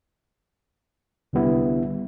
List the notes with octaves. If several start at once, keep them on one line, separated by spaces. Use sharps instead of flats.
C2 D3 G3 B3 E4